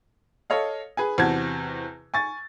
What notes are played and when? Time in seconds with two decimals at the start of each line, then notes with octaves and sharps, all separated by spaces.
0.50 A4 C#5 D#5 F5
0.97 G#4 B4 G#5
1.18 E2 C3 F#4 A5 G#6
2.14 G#5 C#6 A6